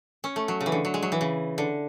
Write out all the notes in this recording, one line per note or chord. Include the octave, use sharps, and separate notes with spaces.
C#4
A3
F#3
C#3
E3
D3
F#3
G#3
F#3
E3
C#3
D3